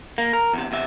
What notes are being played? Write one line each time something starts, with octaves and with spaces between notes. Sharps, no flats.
A#3
A#4
E2 C3
E2 C3 E5